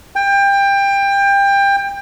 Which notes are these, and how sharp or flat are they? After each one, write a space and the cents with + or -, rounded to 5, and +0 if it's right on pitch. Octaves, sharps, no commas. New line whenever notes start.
G5 +25